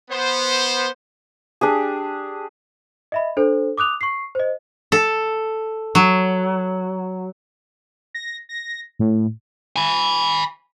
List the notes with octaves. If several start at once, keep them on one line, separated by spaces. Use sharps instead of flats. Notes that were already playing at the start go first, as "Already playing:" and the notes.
B3 C5
D4 G4 G#4
D#5 E5 B5
D4 A4 C5
D6 D#6 F#6 F7
C#6 C7
C5 D#5
A4
F#3
A#6
A#6
A2
G#5 B5